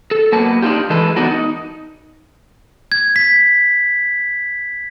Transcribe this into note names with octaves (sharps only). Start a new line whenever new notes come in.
A4
F#3 A#3 B3 A5
D4 D#4 F4 G4
E3 G#3 A4 B4
B3 D4 D#4 F#4 A#4
D#4
G#6
B6